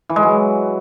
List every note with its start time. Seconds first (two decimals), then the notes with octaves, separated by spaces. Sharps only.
0.09 E3
0.16 G#3
0.23 F#3